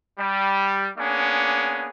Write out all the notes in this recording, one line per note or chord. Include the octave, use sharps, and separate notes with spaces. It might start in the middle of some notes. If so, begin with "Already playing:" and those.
G3
A#3 B3 C#4 D4 G#4